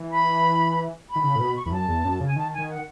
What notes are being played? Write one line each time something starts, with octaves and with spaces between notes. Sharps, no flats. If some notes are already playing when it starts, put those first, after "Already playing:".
Already playing: E3
B5
B5
D#3
C#3
A2
B2
C#6
E2 B5
F#2 A5
E2
F#2
C#3 G#5
D#3 A5
G#5
D#3
F#5